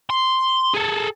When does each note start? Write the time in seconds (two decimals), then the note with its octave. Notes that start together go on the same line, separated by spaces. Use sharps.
0.10 C6
0.75 G#4 A4